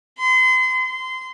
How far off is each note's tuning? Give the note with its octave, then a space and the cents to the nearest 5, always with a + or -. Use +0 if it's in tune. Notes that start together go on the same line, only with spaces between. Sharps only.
C6 -35
C6 -25